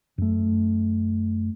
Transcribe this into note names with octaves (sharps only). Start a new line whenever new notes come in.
F#2 A3